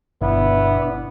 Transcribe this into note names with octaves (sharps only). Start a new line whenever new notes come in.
G1 B2 B3 D4 E4